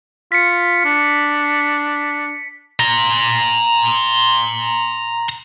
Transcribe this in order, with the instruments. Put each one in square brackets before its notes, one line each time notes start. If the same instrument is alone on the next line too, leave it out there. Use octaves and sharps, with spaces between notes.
[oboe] F4 [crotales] B6 C#7
[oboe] D4
[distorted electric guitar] A#5 C6